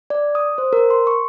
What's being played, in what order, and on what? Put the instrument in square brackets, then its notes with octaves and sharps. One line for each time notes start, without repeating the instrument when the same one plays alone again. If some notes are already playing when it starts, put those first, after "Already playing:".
[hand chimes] D5
D#6
C5
A#4
C6
C#6